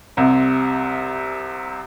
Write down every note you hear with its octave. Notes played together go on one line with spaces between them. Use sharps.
C2 C3